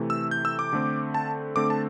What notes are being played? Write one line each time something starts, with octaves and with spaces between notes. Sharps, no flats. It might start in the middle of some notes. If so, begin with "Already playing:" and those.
Already playing: C3 E3 A3
E6
G6
E6
D6
D3 A3 C4
A5
D3 A3 C4 D6
A5